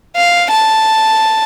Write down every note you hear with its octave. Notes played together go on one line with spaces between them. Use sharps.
F5
A5